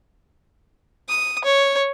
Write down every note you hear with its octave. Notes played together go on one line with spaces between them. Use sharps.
D#6
C#5